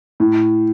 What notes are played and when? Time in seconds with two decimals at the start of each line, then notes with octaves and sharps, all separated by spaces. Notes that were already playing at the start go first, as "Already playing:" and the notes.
0.20 A2